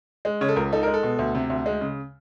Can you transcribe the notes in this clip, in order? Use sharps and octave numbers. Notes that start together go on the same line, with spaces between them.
G#3
C#3 C#5
A4
C#2 A#4
D#4 A4
G#3 A#4
A4
B2
D2
C3
D2
G#3
C#3